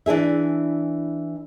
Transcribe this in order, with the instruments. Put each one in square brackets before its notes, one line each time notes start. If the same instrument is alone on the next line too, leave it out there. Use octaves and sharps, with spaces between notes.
[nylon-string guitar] E3 D4 G#4 E5